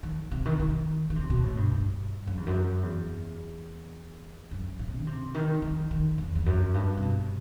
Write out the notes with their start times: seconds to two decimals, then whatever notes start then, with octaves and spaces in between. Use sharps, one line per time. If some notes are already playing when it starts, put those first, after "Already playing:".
0.03 D#3
0.31 C3
0.45 D#3
0.60 D#3
1.10 D#3
1.16 C3
1.30 B2
1.43 A2
1.57 G2
1.72 G2
2.27 F#2
2.37 E2
2.46 F#2
2.83 E2
4.51 F#2
4.79 A2
4.97 D#3
5.07 C3
5.34 D#3
5.62 D#3
5.91 D#3
6.18 E2
6.35 E2
6.46 F#2
6.74 G2
6.97 C3
7.02 B2